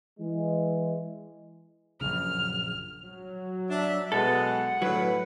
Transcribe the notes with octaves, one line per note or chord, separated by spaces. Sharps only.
E3 G#3
A#1 F#2 C#3 F6
F#3
D4 E5
B2 G#3 A4 F#5
A2 D3 F#3 B4